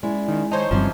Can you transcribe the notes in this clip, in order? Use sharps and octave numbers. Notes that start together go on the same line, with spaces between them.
G#3 C#4 E4 D5
D#3
D#3 D#4 C5 C#5 A5
G1 G2 C#3 E3 F3 G3 C4